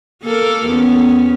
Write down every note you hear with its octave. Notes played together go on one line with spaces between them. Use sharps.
A#3 A4 A#4
E2 B3 C#4